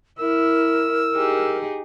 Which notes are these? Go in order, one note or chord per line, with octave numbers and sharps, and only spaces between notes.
E4 A#4 E6
D#4 G4 G#4